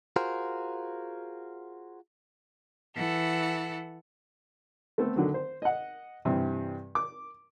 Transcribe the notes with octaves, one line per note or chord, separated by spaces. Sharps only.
F4 F#4 G#4 A#4 C5
E3 A4 F#5
A3 B3 C4 A4
D3 D#3 F#3
C5
D#5 F#5
G2 C3 E3 G3
D6